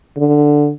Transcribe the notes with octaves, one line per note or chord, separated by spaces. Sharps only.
D3